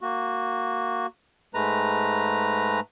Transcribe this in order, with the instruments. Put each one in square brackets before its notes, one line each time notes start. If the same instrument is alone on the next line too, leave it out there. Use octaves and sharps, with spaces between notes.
[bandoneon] A#3 F#4
G#2 G#3 A3 B4 A#5